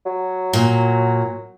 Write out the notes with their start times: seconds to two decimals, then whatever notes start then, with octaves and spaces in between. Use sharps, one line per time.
0.06 F#3
0.53 A#2